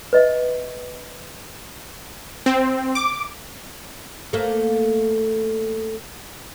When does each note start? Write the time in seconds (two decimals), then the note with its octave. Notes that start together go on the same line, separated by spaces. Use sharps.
0.13 B4 D#5 E5
2.46 C4
2.95 D6
4.33 A3 A#3